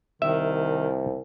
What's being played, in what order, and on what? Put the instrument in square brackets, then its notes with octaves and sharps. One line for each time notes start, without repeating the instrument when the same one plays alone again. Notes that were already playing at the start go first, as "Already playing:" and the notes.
[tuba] C2 [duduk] D#3 [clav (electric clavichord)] E5